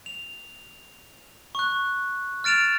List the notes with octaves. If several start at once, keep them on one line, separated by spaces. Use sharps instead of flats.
F7
C#6 F#6
F6 A6 D7 E7 F7